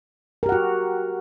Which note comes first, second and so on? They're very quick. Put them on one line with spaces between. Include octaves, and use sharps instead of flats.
A#4 G4 F#5 F#4